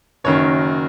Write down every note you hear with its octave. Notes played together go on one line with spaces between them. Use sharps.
F#1 F#2 D#3 C#5